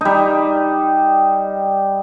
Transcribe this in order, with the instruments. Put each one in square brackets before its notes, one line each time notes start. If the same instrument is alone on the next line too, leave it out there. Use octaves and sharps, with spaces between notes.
[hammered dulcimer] G3 D#4